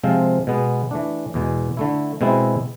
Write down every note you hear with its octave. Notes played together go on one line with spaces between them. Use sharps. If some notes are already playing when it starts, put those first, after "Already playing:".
C3 F3 G#3 C4 F4
B2 G#3 B3
E3 A3 D4
E2 B2 G#3
D3 A3 E4
B2 G#3 C4 E4